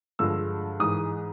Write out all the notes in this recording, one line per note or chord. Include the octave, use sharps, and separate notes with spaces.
G2 D3 F3 G#3 E6
G#2 E3 G#3 D#6